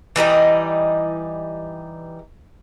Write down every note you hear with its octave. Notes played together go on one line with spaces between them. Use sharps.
E3 G3 D#4 D#5